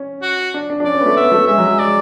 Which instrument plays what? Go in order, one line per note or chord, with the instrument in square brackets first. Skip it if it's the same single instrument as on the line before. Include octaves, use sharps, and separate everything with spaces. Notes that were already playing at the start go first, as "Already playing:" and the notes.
Already playing: [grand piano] C#4
[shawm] F#4
[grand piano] D4
D4
D4
[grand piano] C#4 [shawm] D5
[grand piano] C#4
B3
A3
[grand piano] B3 [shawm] E5
[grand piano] A3
[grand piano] G#3 [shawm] E5
[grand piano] F#3
G#3
[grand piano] G#3 [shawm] D5